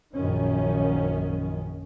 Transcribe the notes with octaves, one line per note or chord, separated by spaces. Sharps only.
A#1 F#2 D#3 C#4